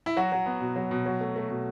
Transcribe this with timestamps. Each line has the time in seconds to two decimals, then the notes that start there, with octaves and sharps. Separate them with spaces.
0.06 E4
0.17 F#3 F#4
0.32 F#3
0.46 B3
0.61 B2
0.76 F#3
0.91 B2
1.06 F#3
1.21 A3
1.36 A3
1.50 B2